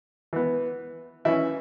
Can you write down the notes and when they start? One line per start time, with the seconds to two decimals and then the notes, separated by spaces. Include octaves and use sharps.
0.33 E3 B3
1.25 E3 C#4 E4